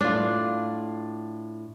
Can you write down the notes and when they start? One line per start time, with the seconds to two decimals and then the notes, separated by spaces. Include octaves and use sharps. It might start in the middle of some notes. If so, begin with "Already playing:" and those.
0.01 A2 D4 F4